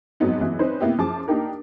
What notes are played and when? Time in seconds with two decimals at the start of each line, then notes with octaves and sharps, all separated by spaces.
0.20 F2 G#2 F#3 B3 D#4
0.41 E3 F#3 G#3 B3 E4
0.59 C4 C#4 D#4 B4 C5
0.81 C3 A#3 B3 E4 G4
0.98 F#2 F3 G#4 A5 D6
1.28 A#3 D4 D#4 G4 A#4